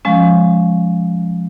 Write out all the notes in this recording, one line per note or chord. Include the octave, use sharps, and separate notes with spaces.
F3 G#3 C#4